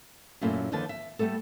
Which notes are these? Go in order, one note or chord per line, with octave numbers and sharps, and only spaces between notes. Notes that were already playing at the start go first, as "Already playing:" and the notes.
F#2 A#2 A3 A#3 C#4 E4
D#2 D3 D#3 F3 B4 A5
E5
G3 A3 B3 A4